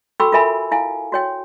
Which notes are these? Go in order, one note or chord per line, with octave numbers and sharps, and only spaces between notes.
F#4 A4 G5 B5 C#6 E6
F4 A4 A#4 E5 G#5 B5
E4 F5 G#5
F#4 C#5 G5